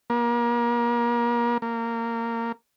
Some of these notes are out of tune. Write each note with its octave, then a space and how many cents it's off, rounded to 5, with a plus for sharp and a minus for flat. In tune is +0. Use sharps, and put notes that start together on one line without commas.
A#3 +35
A#3 -15